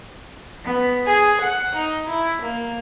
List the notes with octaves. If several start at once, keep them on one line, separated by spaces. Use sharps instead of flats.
B3
G#4
F#5
D#4
E4
A#3